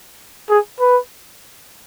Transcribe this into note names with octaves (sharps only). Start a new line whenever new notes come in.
G#4
B4